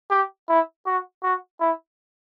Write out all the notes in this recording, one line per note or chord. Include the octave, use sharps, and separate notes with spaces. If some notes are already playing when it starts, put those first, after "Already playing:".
G4
E4
F#4
F#4
E4